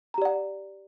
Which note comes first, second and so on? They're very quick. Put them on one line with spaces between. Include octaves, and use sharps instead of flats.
A#5 G4 D5 F#5